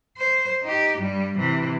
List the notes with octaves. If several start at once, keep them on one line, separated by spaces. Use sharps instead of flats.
C5
D#4 G4
G2 G3
C3 E3